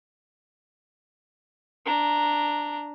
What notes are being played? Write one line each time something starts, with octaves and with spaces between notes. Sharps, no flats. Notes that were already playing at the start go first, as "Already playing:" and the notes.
D4 A#5